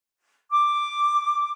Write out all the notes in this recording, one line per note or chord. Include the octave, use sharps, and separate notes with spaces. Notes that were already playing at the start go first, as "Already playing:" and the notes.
D6